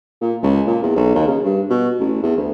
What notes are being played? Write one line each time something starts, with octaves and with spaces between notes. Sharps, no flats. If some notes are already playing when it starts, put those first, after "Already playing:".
A#2
C#2
A#2
E2
B1
D#2
C#3
G2
B2
A1
E2
D2